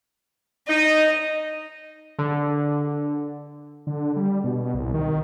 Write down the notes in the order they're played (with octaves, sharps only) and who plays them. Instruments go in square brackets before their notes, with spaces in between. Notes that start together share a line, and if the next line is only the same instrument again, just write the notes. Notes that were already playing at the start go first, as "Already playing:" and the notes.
[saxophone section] D#4 [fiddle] D#5
[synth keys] D3
[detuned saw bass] D3
G3
B2
C2
D#3